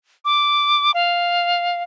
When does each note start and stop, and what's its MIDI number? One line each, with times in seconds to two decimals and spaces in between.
0.25 0.92 86
0.94 1.83 77